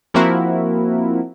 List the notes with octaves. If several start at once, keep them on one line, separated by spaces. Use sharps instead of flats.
F3 A#3 C4 E4 F#4 A#4